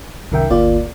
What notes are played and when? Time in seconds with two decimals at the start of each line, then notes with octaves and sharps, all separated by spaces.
0.31 C2 F#2 D#3 A#4 E5 G5
0.50 G1 D2 A#3 F4 D5